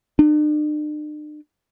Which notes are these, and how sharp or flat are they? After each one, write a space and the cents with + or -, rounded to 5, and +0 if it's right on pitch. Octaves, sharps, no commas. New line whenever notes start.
D4 +45